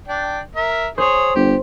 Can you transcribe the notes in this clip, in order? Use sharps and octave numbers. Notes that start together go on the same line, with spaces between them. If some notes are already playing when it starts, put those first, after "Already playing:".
D4 G5
A#4 E5
G#4 C5 C#5
G1 G4